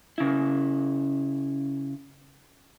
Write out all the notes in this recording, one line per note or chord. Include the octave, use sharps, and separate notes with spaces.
C#3 E4